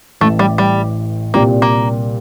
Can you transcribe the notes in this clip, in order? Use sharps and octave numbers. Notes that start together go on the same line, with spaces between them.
A1 A2 E3 A3
G3
G3
C2 A#2 G3 A#3 C4
A#3